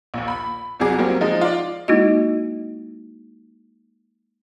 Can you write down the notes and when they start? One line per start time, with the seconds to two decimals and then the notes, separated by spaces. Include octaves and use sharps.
0.14 A#1 D#2
0.28 B5
0.80 C2 F2 F#3 G#4 D6
0.98 F#3 G3 A#3 C4
1.21 F3 G#3 D#4
1.41 F4 D5
1.88 G#3 A#3 D#4 E4 F#4 D#5